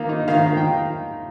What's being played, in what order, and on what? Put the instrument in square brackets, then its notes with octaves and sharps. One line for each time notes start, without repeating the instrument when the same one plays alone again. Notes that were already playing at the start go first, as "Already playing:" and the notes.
Already playing: [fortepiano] D#3 A#3
D#4
D#3 F5
D#3
G5